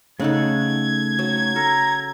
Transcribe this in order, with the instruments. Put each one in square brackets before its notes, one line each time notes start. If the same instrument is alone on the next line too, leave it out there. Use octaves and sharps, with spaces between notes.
[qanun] C#3 D#4 A4 [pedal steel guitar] A3 F#5 [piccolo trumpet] G#6
[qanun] F#3
[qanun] A4 [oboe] A#5